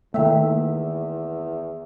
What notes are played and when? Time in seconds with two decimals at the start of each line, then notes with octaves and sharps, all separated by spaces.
0.14 E2 D#3 A3 A#3 E5 G5